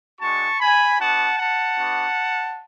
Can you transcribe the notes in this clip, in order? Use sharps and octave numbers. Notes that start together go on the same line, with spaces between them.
G#3 D4 F#4 A5 C#6
G#5 B5
B3 D4 F#4 F#5 A5
F#5 A5
B3 D4 F#4